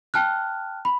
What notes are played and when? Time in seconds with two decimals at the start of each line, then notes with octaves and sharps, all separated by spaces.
0.14 G5 A5 F6 F#6
0.85 B5